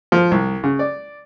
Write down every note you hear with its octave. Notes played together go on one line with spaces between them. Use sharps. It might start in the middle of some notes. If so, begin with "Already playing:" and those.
F3
C2
C#3
D5